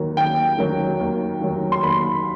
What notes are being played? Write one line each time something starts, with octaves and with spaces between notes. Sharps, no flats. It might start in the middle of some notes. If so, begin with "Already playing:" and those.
Already playing: D#2 D#3 F#3
D#2 G5
D#3 F#3
D#2
D#3 F#3
C6
D#2 B5